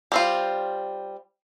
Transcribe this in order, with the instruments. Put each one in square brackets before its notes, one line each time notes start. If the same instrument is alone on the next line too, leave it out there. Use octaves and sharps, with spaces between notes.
[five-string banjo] G3 C4 F4